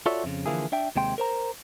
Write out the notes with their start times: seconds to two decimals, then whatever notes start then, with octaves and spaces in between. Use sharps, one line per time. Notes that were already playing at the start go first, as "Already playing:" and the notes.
0.06 F4 F#4 A4 C#5 D5 E5
0.24 F2 C#3
0.46 D3 E3 F3 A#3 E4 G#4
0.72 D4 E5 G5
0.96 D#2 C3 G#3 G5 C6
1.18 A#4 C5 A#5